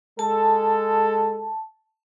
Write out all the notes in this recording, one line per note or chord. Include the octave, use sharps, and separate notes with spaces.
G#3 A4 A5